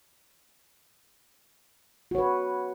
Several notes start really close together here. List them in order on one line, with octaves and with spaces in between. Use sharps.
F#4 C#5 B4